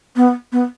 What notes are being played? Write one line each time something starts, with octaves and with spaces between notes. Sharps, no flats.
B3
B3